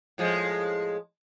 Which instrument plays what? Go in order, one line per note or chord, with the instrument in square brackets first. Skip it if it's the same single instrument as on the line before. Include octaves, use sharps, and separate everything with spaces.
[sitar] A2 F3 G#3